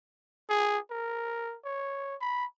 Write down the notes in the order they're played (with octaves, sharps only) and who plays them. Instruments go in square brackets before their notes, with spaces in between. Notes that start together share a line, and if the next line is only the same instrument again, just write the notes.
[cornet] G#4
A#4
C#5
B5